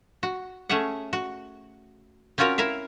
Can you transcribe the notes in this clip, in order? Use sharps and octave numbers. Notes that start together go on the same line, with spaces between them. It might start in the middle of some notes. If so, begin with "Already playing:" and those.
F#4
A3 C#4 G#4 E5 F#5
F#4
C4 C#4 F4 F#4 A#4 C#5
E4 A#4 E5 F5